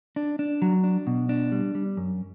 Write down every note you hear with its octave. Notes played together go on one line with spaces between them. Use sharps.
D4
D4
F#3
D4
B2
D4
G3
G3
F#2